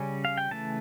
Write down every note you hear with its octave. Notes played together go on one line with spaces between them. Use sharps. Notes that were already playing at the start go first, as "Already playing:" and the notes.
Already playing: C#3 G3 C#4
F5
G5
C#3 E3 A3 A5